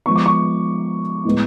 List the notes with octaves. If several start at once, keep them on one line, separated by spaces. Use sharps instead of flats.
F3 G#3 B3 C#6
D6
C#6
A2 G#3 B3